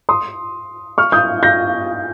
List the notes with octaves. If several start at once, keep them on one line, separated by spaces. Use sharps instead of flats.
C6 D#6
C#6 F6
D#6 G6
G6 A#6